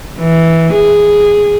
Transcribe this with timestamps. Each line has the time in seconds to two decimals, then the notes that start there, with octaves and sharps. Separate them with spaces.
0.20 E3
0.74 G#4